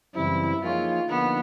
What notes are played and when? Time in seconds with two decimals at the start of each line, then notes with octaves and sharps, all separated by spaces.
0.15 F#2 C#3 E3 G3 C4 E4
0.62 F3 A#3 D#4 F4 G#4 C#5
1.08 D3 F3 A#3 B3 D#4